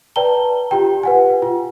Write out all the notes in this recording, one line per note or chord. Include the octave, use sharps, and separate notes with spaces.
B4 D5 G5 A5 A#5 G7
F4 G4 G5
B4 F#5 G#5
F4